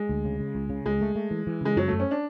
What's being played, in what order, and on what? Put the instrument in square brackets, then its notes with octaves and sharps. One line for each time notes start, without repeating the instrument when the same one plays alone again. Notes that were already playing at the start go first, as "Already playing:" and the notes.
Already playing: [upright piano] G#3
[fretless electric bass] D2
C#3
C#3
C#2
C#3
[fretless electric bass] C#2 [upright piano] G#3
[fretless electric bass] A3
A3
E3
E3
[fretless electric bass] C#3 [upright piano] G#3
[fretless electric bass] F#2 [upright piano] F#3
[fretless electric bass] F#2 [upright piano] A3
[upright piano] C#4
D4